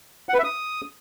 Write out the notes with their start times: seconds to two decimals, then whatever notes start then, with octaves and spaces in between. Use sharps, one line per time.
0.29 F#5
0.34 B4
0.39 E5
0.44 D#6